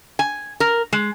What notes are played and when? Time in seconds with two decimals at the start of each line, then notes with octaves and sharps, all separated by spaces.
0.19 G#5
0.60 A#4
0.93 G#3